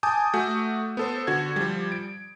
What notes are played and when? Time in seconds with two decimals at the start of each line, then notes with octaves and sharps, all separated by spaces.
0.03 G#5 A5 D6 D#6 G6
0.34 A3 F#4 G6
0.97 B3 A4 C5
1.27 D3 F#4 G#6
1.56 F3 G3
1.92 D7